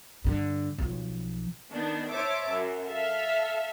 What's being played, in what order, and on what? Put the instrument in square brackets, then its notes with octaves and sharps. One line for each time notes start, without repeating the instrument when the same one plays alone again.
[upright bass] G2 D3
B1 F3
[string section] D#3 B3 D4
C5 C#5 E5 A5 D6
F#2
A4 E5 F5